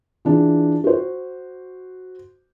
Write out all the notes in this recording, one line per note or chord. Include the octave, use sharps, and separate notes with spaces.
E3 D4 F4 G#4
F#4 C5